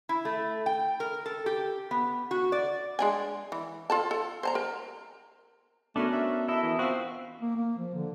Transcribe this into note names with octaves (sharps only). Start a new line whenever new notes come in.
E4
A3
G5
A#4
A4
G4
B3
F#4
D5
G#3 D4 G#5
E3
F4 A4 A5
A4
C5 A5 A#5
A#4
A3 B3 C#4 D4 F#4 A#4
E5
E4 A4 D#5 E5
E3
C4 F4 F#4 E5 F5
A#3
A#3
F3
D3